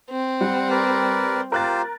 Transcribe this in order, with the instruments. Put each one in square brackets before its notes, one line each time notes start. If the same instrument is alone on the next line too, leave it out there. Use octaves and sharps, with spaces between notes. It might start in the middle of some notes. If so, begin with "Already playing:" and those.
[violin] C4
[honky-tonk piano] G3 [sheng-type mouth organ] F#5
[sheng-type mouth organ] A#4 B4 D5
[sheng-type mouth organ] F4 G4 C5 [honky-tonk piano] A#4 F#6 A6